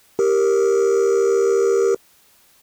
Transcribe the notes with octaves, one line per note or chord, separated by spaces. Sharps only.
G4 A#4